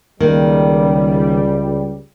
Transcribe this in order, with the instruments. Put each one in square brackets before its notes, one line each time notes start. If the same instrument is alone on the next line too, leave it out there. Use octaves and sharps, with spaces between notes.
[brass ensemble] C#2 G3 [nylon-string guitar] D#3 A#3